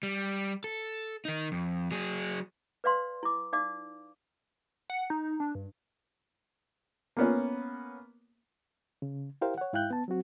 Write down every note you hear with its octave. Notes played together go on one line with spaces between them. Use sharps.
G3
A4
D#3 D#4
F2
F#3 G#4
B4 D5 F5 C6
E4 D6
D#4 D5 F5 D6
F#5
D#4
D4
G2
A#3 B3 C#4
C#3
E4 G4 A#4 C5 F5 G5
C#5 F#5
G#2 E4 F5 G5 F#6 G6
B3 A5
F#3 C4 F#4